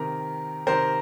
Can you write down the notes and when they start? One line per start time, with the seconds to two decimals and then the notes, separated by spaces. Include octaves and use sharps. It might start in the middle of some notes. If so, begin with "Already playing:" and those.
Already playing: C3 D#3 A#4
0.67 C3 D#3 A#4 C5